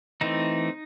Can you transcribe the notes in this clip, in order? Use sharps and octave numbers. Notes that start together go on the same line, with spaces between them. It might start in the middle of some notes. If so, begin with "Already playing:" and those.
E3 A3 C4 D#4